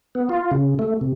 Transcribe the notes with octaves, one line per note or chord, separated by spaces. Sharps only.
B3
F4
C#3
A3
C3